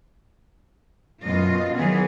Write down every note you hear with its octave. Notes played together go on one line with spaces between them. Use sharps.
F#2 B2 F4 D#5
D#3 E3 F#3 B3 G#4